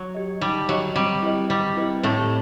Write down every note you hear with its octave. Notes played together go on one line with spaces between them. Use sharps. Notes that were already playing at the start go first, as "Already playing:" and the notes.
Already playing: F#3
G4 D#5
G3 D#4
F#3 G4 D#5
G3 C4
E4 G4 B4 D#5
G3 C4
E4 G4 B4 D#5
A2 A3 C4